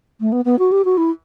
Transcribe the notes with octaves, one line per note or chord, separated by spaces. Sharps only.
A3
B3
B3
F#4
G4
F#4
E4